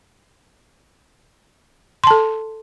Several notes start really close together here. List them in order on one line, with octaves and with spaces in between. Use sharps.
C6 A5 A4